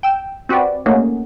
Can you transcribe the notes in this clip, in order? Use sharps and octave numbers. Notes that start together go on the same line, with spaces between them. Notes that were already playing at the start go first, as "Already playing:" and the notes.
G5 E6
C4 F#4 G4 B4 D5
A3 A#3 C#4 D#4 F#4 G#4